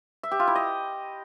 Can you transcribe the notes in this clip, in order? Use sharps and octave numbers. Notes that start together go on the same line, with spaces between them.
E5
G4
F4
E4
D#5